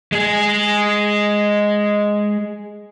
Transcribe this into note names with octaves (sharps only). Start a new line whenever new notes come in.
G#3 G#4